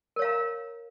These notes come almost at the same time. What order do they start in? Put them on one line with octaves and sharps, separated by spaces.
A#4 C#5 F5 A#5